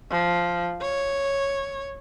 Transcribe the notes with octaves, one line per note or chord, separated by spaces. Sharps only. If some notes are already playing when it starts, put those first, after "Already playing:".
F3
C#5